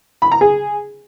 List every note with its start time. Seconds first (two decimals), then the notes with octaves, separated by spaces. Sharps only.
0.22 B5
0.31 A#5
0.41 G#4